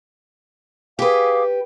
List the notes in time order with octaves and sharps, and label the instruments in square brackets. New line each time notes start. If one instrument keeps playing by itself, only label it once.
[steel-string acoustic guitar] G4 B4 [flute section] G#4 F5 D6